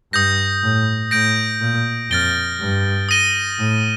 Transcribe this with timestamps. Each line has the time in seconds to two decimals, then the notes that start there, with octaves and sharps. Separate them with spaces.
0.13 G2 D#6 G6 A#6
0.63 A2
1.11 A2 G6 A#6 D7
1.61 A#2
2.10 F2 F6 A6 D7 G7
2.60 G2
3.09 D#6 A#6 D#7 G7
3.59 A2